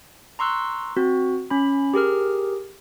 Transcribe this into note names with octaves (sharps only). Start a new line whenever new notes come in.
A#5 C6 C#6 E6 F#6
C4 F#4
C#4 B5
G4 G#4 A#4 F6